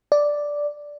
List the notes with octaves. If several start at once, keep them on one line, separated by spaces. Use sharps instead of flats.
D5